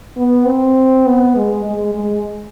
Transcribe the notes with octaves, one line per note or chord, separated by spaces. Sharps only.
B3
C4
B3
G#3
G#3
G#3